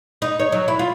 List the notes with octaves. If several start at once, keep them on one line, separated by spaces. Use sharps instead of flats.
D#4
C#5
F#3
E4
F4